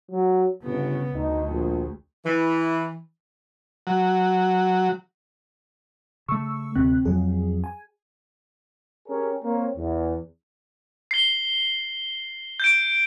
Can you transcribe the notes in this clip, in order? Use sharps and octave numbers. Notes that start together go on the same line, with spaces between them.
F#3
G1 C#3 B3
D2 D#4
A#1
E3
F#3
C#3 A3 C#6 E6
D2 C3 C4 F#6
F2 F#3 G#4
G#5
C#4 G4 G#4 A#4 C#5
A#3 C4 A#4 C#5
E2
C7 G7
G6 D7